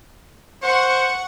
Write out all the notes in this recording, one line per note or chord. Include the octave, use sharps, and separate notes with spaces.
C5 F#5 C#6 C#7